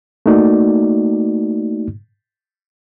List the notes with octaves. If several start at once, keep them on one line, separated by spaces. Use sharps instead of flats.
A3 A#3 D#4 F#4 D5